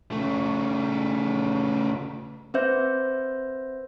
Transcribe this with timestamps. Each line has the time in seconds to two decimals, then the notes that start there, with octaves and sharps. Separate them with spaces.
0.11 C#3 A3
2.54 C4 B4 C5 E5 G6